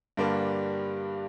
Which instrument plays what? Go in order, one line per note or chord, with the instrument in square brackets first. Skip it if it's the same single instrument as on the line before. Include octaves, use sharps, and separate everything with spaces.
[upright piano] G2 D3 G3 A#3 D4